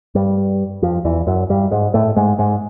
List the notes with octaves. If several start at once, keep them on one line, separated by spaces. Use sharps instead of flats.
G2 G3
F2 F3
E2 E3
F#2 F#3
G2 G3
G#2 G#3
A2 A3
G#2 G#3
G#2 G#3